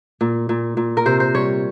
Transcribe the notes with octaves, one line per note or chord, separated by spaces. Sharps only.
A#2
A#2
A#2
A#4
C3 C5
C5
G3 C#5